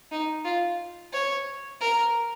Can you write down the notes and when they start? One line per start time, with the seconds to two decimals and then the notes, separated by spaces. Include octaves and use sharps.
0.11 D#4
0.45 F4
1.13 C#5
1.81 A#4